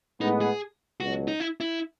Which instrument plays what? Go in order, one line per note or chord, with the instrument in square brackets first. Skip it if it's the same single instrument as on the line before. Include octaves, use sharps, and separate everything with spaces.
[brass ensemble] A2 G#3 B3 [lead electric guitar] D#4
[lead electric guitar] G#4
[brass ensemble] C#2 B2 F#3 [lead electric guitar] F#4
[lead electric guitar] D#4
E4
E4